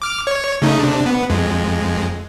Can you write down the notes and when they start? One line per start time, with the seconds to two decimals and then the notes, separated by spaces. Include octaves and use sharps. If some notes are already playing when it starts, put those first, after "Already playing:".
0.02 D6 F6
0.27 C#5
0.62 C#3 A3 D#4
0.80 C3 D4
1.06 B3
1.30 F2 G#3